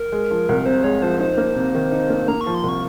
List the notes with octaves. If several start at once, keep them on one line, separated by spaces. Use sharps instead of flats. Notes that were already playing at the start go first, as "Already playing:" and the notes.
Already playing: A#4
G#3
F3
C2
C3 C5
G#3 C#5
F3 C5
D#4 C5
A#3
C3
D#3
D#4
A#3
A#3 A#5
C#6
F3
C6
C2
C#6